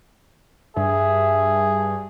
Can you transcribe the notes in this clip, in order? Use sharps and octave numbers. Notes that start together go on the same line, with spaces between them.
G2 G#4 E5